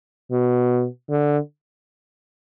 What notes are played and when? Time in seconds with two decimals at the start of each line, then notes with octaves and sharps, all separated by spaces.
0.32 B2
1.10 D3